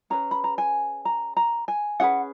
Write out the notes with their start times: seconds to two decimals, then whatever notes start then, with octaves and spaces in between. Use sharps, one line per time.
0.10 C#4 G#4 B4 A#5
0.31 B5
0.44 A#5
0.58 G#5
1.05 A#5
1.37 A#5
1.68 G#5
2.00 C#4 G#4 B4 F#5